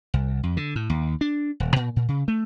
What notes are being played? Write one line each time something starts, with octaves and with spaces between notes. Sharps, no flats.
C2
F2
D3
A2
D#2
D4
D#1
A#2
A#2
C#3
A3